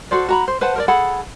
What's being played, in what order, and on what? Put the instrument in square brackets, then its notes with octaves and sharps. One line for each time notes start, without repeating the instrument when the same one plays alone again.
[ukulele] F#4 A4 C5 D5
F#4 A#5 B5
C5
B4 C5 F#5 A5
A#4 C5 D5
G#4 A4 F#5 B5